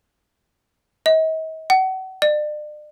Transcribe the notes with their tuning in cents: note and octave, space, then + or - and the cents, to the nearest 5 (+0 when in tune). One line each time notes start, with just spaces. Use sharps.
D#5 +40
F#5 +35
D5 +40